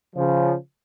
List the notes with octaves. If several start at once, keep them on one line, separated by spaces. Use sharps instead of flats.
C#3 F3